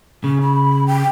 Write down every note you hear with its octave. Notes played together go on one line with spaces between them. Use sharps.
C#3 C#4
B5
G5